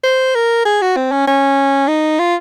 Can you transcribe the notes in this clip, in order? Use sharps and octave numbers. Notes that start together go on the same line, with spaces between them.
C5
A#4
G#4
F#4
C4
C#4
C#4
D#4
F4